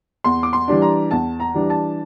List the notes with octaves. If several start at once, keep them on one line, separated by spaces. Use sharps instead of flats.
E2 C6
D6
C6
E3 G3 D4
A#5
E2 A5
A#5
E3 G3 D4
A5